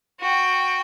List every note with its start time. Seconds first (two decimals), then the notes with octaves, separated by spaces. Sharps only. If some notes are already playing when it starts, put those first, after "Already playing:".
0.20 F#4 G5